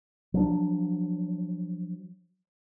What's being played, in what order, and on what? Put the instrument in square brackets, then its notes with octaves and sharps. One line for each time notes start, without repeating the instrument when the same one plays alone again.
[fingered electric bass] F3 F#3 D4